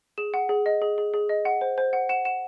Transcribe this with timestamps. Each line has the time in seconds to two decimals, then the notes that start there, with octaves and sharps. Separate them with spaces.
0.18 G#4 E7
0.34 F#5
0.49 G#4
0.66 D#5
0.82 G#4
0.98 G#4
1.14 G#4
1.29 D#5
1.45 F#5
1.61 C5
1.78 C5
1.93 F#5
2.09 F#5 E7
2.25 F#5 E7